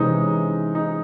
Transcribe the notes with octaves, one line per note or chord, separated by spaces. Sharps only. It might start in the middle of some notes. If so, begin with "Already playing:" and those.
Already playing: C3 E3 G#3 C#4 D#4
D#4